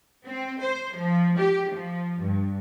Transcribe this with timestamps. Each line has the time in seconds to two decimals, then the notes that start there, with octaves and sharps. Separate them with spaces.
0.25 C4
0.60 C5
0.96 F3
1.37 G4
1.70 F3
2.20 G2